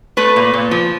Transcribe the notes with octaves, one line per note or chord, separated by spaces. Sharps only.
A3 B4
A#2
A#2
F3